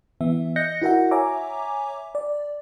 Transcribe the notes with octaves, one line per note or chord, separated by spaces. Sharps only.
E3 B3 E5
D#5 F#6 G6 A#6 C#7
E4 F#4 A#4 E5 F#5
C#5 E5 G#5 A#5 D6
D5